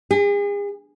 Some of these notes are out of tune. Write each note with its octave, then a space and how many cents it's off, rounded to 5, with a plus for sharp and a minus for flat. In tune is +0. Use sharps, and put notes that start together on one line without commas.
G#4 -40